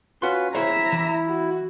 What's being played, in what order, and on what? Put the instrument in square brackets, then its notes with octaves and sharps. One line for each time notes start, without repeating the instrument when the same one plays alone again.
[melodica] C#4 F4 B4 [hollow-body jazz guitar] F#4 C6
[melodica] E4 [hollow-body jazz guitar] G#4 C5 C#5 [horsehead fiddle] E5 A#5
[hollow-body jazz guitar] E3
[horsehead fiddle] F#4